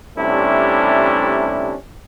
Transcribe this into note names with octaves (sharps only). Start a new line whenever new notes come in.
C3 G3 A3 C#4 D4 E4